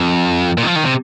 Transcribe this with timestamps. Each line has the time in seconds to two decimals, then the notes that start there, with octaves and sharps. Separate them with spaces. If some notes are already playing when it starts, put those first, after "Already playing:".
Already playing: F2
0.58 A#2
0.63 D#3
0.67 F3
0.76 D#3
0.85 C3